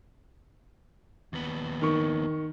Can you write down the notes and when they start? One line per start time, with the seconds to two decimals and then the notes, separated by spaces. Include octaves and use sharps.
1.33 D#2 B3
1.82 D#3 C#6